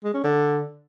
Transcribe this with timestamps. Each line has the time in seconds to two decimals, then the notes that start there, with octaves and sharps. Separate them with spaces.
0.04 G#3
0.14 C#4
0.24 D3